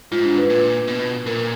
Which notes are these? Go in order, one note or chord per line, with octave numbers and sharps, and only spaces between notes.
G#2 F4
D4
B4
A#2 B4
B2
A#2 A#4